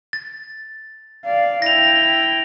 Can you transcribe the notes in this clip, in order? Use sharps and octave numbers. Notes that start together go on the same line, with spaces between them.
A6
D5 F5
E4 G5 A#6 F7